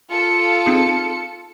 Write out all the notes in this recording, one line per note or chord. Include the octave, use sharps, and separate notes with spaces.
F4 A4 C#7
C4 D#4 G#4